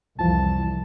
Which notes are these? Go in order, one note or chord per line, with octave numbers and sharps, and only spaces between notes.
C2 F2 E3 F3 A5